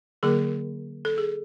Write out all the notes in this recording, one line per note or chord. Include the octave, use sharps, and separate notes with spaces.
D3 F#3 A#3 G#4 A#4
A4
G#4